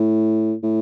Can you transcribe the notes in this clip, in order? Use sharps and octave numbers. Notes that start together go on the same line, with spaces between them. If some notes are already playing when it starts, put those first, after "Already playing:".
Already playing: A2
A2